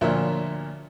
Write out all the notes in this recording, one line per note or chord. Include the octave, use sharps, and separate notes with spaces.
D2 A#2 F3 C#5 E5